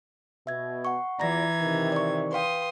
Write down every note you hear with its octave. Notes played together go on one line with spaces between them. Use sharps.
B2 E5 G#6
F#5 C#6
E2 E3 F4 D5 A#5 G#6 A#6
C3 D#3
D5 C#6
B4 F5 G5 C6 D#6